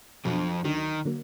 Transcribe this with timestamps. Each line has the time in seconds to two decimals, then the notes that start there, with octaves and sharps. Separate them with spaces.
0.25 F2 B2 F3 F#3 D4
0.64 D2 D3 D#3 F#3 D4
1.05 D3 F#3 A#3